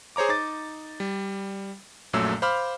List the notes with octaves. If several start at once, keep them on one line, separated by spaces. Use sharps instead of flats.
G#4 C5 C#5 A#5 D6
D#4 D6 A6
G3
A#1 F#2 A#2 F#3 A3 E6
C5 F5 B5 D6 F6